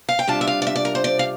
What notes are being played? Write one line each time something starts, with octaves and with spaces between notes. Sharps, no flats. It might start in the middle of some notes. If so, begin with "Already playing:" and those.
F5
G5
C3 G3 D4 F4 A5
E5
F5
D5
E5
D5
A#4
C5
D5
F5